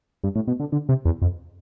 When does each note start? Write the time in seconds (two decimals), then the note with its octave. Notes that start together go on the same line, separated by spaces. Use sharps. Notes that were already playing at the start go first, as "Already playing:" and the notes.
0.24 G2
0.35 A2
0.48 B2
0.60 D3
0.72 D3
0.89 C3
1.05 E2
1.22 F2